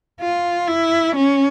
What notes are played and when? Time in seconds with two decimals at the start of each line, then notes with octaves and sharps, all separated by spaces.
0.21 F4
0.68 E4
1.16 C#4